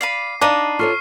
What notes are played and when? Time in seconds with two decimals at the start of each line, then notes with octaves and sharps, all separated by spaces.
0.01 D5 F5 B5 C7 D#7
0.41 D4 D#4 D5 D#5 F5 B5
0.79 F4 A4 C#5 C#6 F6 C7